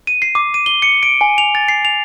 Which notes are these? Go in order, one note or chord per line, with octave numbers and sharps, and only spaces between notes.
D#7
C7
D6
D#7
G7
C#7
D7
G#5
F7
A6
C7
F7